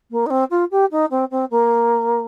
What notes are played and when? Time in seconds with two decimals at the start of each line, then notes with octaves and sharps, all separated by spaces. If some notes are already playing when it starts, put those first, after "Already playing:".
0.11 A#3
0.26 D#4
0.30 C4
0.50 F4
0.71 G4
0.91 D#4
1.11 C4
1.31 C4
1.51 A#3